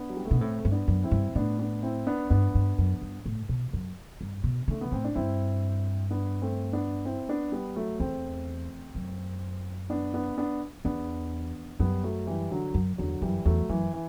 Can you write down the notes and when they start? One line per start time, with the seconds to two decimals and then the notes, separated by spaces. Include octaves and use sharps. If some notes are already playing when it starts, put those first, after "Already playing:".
Already playing: B3 D4
0.10 F#3
0.17 G3
0.25 A3
0.31 B2 B3
0.40 A2 A3 C4
0.65 G2
0.72 B3 D4
0.88 F#2
1.04 C4 E4
1.11 G2
1.35 A2 B3 D4
1.59 B3 D4
1.82 C4 E4
2.07 B3 D4
2.30 G2 B3 D4
2.55 G2
2.78 F#2
3.02 G2
3.26 A2
3.49 B2
3.73 F#2
4.21 G2
4.44 B2
4.68 D3 A3
4.81 B3
4.92 A2 C4
5.05 D4
5.15 G2 C4 E4
6.11 B3 D4
6.42 A3 C4
6.73 B3 D4
7.05 C4 E4
7.29 B3 D4
7.52 G3 B3
7.76 F#3 A3
7.99 E2 A3 C4
8.95 F#2
9.90 B3 D4
10.14 B3 D4
10.38 B3 D4
10.85 E2 B3 D4
11.79 F#2 G3 B3
12.04 F#3 A3
12.27 E3 G3
12.52 D3 F#3
12.74 F#2
12.98 E2 D3 F#3
13.22 F#2 E3 G3
13.45 E2 F#3 A3
13.69 F#2 E3
13.94 E3